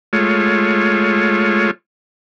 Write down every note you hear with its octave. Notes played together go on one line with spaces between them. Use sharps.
G#3 A3 F4 C#5